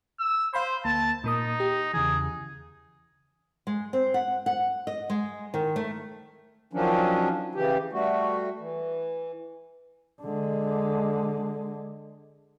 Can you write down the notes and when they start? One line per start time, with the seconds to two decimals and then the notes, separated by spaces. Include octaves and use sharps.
0.19 E6
0.54 C5 F5 B5 C6
0.85 D2 A#3 A5
1.24 A#2 A#3 D#4 D#6
1.60 G4
1.93 E2 C#3 E3 G#4
3.67 G#3
3.93 C4
4.14 F#5
4.46 F#5
4.87 D#5
5.10 G#3
5.54 D#3
5.76 A3
6.73 D#3 F3 F#3 C#4 D4
7.55 C#3 E3 G4
7.92 G3 A3 F#4
8.59 E3
10.22 D3 G#3